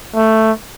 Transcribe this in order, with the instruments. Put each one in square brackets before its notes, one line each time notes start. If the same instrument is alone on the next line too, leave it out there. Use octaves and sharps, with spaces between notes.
[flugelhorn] A3